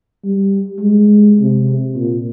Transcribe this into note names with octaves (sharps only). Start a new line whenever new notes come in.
G3
G#3
C3
A#2